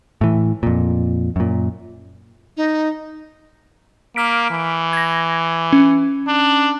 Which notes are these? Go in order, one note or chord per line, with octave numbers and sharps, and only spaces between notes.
A2 E3
F2 A#2
F#2 A#2
D#4
A#3 F6 B6 D7
E3
G#6 A#6
C#4
D4